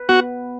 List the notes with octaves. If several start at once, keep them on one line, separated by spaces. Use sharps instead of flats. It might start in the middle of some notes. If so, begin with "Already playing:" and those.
Already playing: B4
B3 F#4